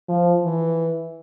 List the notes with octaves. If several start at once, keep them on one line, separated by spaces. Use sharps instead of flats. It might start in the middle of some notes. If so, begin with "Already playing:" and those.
F3
E3